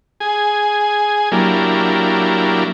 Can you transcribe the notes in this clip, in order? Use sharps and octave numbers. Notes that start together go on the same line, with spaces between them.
G#4 G#5
F#3 A#3 D4 E4 G4 A#4